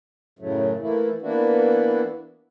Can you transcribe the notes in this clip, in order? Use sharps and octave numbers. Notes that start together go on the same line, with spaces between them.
F#2 A2 C#3 F#3 A3
E3 A3 A#3 E4
E3 A#3 B3 D4 E4 F#4